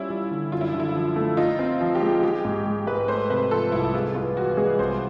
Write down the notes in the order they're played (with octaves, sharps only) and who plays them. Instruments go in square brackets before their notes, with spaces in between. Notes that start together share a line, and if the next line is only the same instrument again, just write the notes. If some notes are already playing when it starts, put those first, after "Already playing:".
Already playing: [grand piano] G3 C#4 [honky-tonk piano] E4 F4
[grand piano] G3
D3
[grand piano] F#2 [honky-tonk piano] F4
[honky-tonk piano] E4
[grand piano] D3
[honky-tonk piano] E4
[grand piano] F3
A3
[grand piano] D#4 [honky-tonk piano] F4
[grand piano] C4
F3
[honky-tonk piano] G4
[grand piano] G#3
[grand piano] G#3 [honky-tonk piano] G4
[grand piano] G#2
G#3
[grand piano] G#2 [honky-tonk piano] B4
[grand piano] A3 [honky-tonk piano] C5
[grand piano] C3 [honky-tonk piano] B4
[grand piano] F3 [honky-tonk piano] A4
[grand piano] C2 [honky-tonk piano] E4
[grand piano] G#3 [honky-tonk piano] F4
[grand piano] B3 [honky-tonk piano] F4
[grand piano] E3 [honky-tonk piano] F#4
[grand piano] G#3 [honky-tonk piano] G#4
[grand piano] C2 [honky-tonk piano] C5